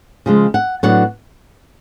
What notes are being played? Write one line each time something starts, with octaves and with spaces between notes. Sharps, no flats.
C#3 F3 G#3
F#5
A2 F#3 B3 D4 F#5